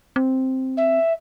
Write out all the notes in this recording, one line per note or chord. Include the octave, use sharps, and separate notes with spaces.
C4
E5